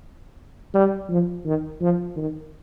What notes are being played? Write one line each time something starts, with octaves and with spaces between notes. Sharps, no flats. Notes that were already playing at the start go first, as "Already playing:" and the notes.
G3
F3
D#3
F3
D#3